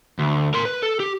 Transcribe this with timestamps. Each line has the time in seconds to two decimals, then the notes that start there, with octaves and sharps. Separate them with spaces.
0.19 D2
0.54 A#4 C6
0.65 B4
0.82 A4
1.00 G4